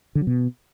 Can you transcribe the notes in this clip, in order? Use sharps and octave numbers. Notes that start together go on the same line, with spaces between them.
D3
F#3
B2